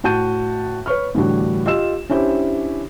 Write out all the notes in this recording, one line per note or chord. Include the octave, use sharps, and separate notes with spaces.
A2 F#4 A5 G6 D#7
B4 C#5 C#6 F6
A2 D3 E3 G3 D4 F#4
F4 G4 D#5 E6 E7
C#4 D4 E4 G4 C5